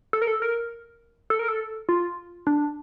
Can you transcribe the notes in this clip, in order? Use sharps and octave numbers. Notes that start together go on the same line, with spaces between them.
A4
A#4
A4
A#4
A4
A#4
A4
F4
D4